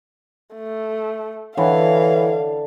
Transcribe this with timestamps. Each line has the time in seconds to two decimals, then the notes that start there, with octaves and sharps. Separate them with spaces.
0.56 A3
1.57 D3 E3 C#5 F5